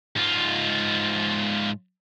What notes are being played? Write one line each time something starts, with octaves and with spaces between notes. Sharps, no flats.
G#2 F4